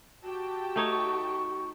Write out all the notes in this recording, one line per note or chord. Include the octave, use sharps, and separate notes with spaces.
F#4 G4 G5 A5
A3 D#4 C#5 C#6